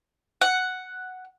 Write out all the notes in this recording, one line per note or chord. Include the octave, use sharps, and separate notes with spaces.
F#5